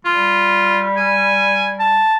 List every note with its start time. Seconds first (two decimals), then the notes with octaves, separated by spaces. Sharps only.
0.05 G3 F4
0.96 G#5
1.79 A5